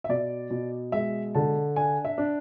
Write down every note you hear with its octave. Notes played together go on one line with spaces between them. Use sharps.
E5
B2 D5
B2
G#3 E5
D3 A5
D4 G#5
E5
D4